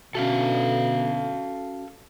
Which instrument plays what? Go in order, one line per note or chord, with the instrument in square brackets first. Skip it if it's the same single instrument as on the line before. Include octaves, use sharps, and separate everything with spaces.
[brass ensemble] B2 D3 [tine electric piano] C#4 F#4 [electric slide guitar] A4 E5 F5